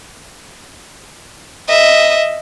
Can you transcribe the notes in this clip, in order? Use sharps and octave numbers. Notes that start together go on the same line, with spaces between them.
D#5 E5